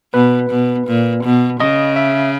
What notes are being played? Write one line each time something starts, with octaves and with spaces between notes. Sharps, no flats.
B2 B4
B2
A#2
B2
C#3 D#5
E5